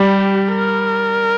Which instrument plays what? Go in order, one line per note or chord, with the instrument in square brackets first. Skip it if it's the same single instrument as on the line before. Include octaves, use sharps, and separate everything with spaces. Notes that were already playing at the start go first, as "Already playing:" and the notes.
Already playing: [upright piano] G3 [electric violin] G4
[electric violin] A#4